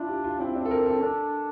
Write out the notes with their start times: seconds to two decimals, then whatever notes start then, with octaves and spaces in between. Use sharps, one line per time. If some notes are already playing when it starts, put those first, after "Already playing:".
Already playing: D4 E4 F4
0.09 G4
0.24 F4
0.40 C4 E4
0.55 D4
0.65 A4
0.71 A#4
0.86 A4
1.01 D4 A4